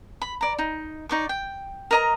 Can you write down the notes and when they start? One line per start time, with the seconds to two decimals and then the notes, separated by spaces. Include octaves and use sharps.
0.22 B5
0.41 D5 A#5
0.59 D#4
1.09 D#4 D5 C#6
1.29 G5
1.91 A#4 D#5 A#5